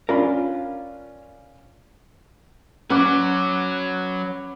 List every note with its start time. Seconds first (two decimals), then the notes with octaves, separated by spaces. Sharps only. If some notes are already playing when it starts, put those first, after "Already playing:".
0.09 C#4 D4 F4 A#4 F5 B5
2.90 F#3 C#4 F#4 B4 D6